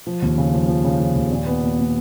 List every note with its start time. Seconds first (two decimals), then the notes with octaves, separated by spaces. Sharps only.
0.07 F3
0.22 D#2
0.38 C#3
0.54 F3
0.68 F3
0.84 C#3
0.99 F3
1.15 D#2
1.31 A#2
1.46 B3
1.61 A#2
1.78 A#2